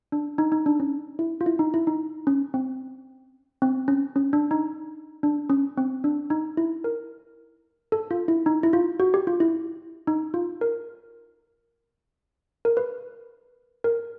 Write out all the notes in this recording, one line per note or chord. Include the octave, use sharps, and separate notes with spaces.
D4
D#4
D#4
D4
C#4
E4
F4
E4
D#4
E4
D#4
C#4
C4
C4
C#4
C#4
D4
D#4
D4
C#4
C4
D4
D#4
E4
A#4
A4
F4
E4
D#4
E4
F4
F#4
G4
F4
E4
D#4
F4
A#4
A#4
B4
A#4